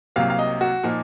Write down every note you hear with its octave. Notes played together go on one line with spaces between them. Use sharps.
C2 C3 F#3 A#3 F5
F5
D#5
F#4
A#2 F3 A#3 D#4